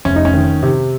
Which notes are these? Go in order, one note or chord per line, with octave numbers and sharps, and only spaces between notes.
F1 C#4
D#4
C#4
D#3
C3